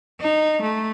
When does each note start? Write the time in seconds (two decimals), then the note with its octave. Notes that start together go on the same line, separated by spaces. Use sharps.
0.20 D#4
0.62 A3